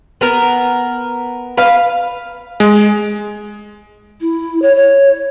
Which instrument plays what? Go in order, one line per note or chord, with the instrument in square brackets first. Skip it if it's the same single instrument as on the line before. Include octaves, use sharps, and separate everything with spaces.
[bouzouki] B3 A#4
B4 F5
[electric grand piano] G#3
[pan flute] E4
C#5
C#5